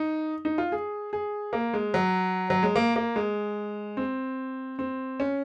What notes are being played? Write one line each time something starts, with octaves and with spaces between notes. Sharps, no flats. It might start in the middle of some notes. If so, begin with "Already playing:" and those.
Already playing: D#4
D#4
F4
G#4
G#4
A#3
G#3
F#3
F#3
G#3
A#3
A#3
G#3
C4
C4
C#4